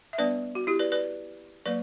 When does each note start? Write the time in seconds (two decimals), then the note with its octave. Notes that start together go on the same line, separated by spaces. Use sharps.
0.13 E5
0.18 G3 B3 D4 B4 D5
0.55 F#4
0.67 E4 G4
0.79 B4 D5
0.92 B4 D5
1.66 F#3 A#3 B4 D5